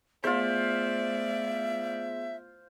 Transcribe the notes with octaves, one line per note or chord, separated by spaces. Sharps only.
A3 B3 F4 G#4 C5 D5 E5 B6